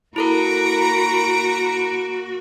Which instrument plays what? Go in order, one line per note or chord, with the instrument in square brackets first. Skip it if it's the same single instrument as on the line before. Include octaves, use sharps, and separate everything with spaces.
[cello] A#3 F#4 [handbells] E4 A4 A#4 [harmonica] A#5 B5 [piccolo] D7